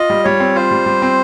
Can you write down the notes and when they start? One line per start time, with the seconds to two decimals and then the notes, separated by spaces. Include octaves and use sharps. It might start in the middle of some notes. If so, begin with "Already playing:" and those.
Already playing: F4 D#5
0.10 G3
0.24 G3 C#5
0.40 C4
0.55 F4 C5
0.71 G3
0.86 G3
1.02 C4